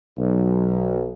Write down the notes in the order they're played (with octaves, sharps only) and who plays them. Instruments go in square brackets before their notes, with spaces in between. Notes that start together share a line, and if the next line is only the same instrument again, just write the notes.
[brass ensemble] B1